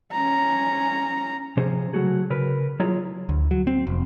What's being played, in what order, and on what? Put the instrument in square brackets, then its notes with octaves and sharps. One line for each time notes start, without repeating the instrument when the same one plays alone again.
[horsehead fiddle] C#4 A#5
[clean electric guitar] C3 F3 C#4 G#4 C5
C#3 F#3 A3 F#4 G#4
C#3 A#4 B4
F#3 E4 F4 G#4 C#5 A#5
[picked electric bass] D2
F#3
C4
F1